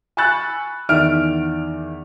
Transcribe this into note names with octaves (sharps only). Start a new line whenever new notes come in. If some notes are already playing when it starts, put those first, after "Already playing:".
G#5 B5 C#6 E6 F#6 A6
E2 D#3 D5 E5 F6 D7